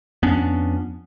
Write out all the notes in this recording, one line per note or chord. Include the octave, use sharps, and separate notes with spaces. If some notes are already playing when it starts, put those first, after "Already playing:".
F2 B3 C#4 D4